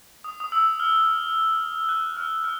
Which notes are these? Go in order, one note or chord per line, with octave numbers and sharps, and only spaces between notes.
D#6
D#6
E6
F6
F#6
F6
F6